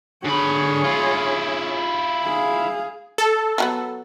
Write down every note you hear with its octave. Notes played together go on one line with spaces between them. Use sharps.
D3 G#4 C#5 B5
E4 F4
G#4 F5
A4
F3 F#3 B3